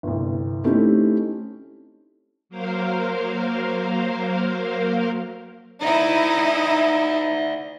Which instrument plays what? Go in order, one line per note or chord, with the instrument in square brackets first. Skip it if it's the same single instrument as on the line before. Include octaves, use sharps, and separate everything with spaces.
[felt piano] G1 C2
A3 C4 C#4 D#4 E4 G4
[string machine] F#3 A#3 A#4 C5 F5
[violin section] D#4 E4 [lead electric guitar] D5 E5